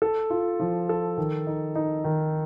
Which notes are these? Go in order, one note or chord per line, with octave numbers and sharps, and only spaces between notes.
A4
F4
F3
A4
D#3
D#4
D#4
D#3